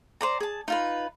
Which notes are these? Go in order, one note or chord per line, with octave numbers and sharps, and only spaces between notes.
C5 D5 A#5
G#4 A5
D#4 F4 B4